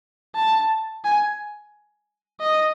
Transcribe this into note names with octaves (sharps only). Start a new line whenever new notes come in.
A5
G#5
D#5